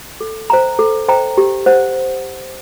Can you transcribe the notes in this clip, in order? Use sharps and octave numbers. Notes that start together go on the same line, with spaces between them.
A4
C5 D#5 G5 A#5
A4
C5 D#5 G5 A#5
G4
C5 F#5